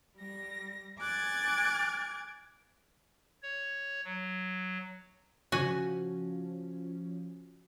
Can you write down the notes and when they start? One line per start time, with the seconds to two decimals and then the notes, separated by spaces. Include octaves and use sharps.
0.19 G3 A#6
1.00 G#5 D6 F#6 G#6 A6
3.43 C#5
4.04 F#3
5.52 C#3 F3 C#4 F#4 G#5